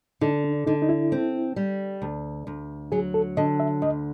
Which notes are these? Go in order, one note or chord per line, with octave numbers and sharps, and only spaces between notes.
D3 D#4
D4
D3 D#4
D#4
E4
C4
G3
D2
D2
F#3 G#4
A4
D3 D#5
E5
D2 D#5